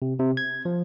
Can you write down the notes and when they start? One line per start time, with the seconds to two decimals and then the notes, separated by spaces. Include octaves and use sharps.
0.02 C3
0.19 C3
0.37 G#6
0.65 F3